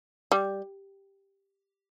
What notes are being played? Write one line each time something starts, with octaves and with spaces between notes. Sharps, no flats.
G3